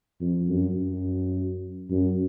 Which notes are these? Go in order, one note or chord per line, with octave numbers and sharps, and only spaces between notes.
F2
F#2
F#2
F#2